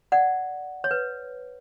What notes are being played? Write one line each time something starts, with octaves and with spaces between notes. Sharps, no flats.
D5 F#5
C#5
B4